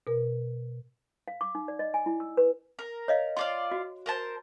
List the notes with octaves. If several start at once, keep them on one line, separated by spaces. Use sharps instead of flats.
B2 A#4
F5
D6
D#4
D5
D#5
G#5
E4
E6
B4
A#4
C#5 D#5 F5
F4 D5 F5 C6
F#4
A#4 C5 A5